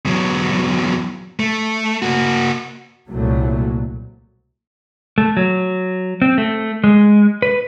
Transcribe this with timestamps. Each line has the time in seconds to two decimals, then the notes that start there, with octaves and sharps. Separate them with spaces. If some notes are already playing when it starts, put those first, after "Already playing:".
0.05 E2 F#3
1.40 A3
2.02 A#3 F#4
3.10 C2 A#2 F#3 A3
5.18 A3
5.37 F#3
6.22 C4
6.38 A3
6.84 G#3
7.42 B4